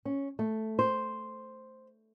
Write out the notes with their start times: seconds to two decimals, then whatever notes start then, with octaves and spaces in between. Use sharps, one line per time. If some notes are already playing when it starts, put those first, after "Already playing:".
0.05 C#4
0.39 A3
0.79 C5